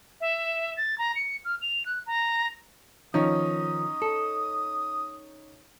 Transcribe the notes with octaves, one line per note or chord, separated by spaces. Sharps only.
E5
A6
A#5
C#7
F6
F7
F#6
A#5
D#3 F3 C#4 D#4 D#6
A4